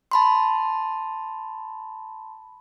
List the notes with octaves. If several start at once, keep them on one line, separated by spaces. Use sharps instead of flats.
A5 B5 C6